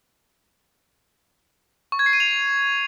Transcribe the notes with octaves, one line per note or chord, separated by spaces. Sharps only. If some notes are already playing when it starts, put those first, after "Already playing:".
C#6
G#6
C7
D#7
F7